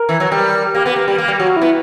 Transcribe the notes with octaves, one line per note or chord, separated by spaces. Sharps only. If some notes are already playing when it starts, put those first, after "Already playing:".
Already playing: A#4
E3
F#3
G3
A#3 G4
B3
G4
A#3
G3
A#3
G3
F#3 F#4
E4
B3